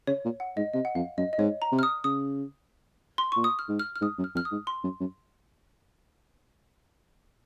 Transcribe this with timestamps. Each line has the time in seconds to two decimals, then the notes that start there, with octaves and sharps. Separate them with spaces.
0.07 C#3 C#5
0.25 A#2
0.40 F#5
0.57 G#2 D#5
0.74 C3 D#5
0.85 F#5
0.95 F2 F5
1.17 F#2 D#5
1.33 D#5
1.39 G#2 C#5
1.62 A#5
1.72 C3
1.79 F6
1.83 D#6
2.04 C#3 D#6
3.18 C6
3.32 A#2 C#6
3.44 D#6
3.59 F6
3.69 G#2
3.79 F6
3.96 F6
4.01 G#2 D#6
4.18 F#2
4.24 F6
4.35 F2 F6
4.45 D#6
4.52 G#2
4.67 C6
4.84 F#2
5.00 F#2